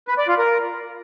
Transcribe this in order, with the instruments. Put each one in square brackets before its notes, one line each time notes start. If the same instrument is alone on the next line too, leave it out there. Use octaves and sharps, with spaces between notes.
[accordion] B4
D5
F4
A#4